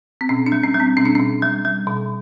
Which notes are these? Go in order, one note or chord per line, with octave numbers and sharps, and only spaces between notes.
C4
B2 C#4
D4
G3
C#4
G3
C4
B2 C#4
D4
B2 C#4
G3
G3
B2